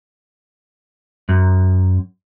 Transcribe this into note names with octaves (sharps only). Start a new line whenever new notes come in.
F#2